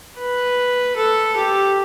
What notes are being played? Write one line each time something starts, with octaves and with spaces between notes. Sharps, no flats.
B4
A4
G4